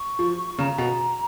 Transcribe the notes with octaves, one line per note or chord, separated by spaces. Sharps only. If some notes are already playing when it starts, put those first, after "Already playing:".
Already playing: C#6
F3
C#3 A#5
B2